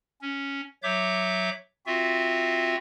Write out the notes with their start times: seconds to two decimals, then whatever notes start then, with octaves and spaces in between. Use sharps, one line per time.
0.22 C#4
0.83 F#3 C#5 E5 D6 G6
1.86 C4 F4 F#4 E5